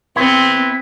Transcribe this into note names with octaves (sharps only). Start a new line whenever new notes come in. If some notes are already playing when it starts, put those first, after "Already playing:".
B3 C4 E4